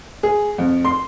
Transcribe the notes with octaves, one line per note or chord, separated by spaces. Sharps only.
G#4
F2
C6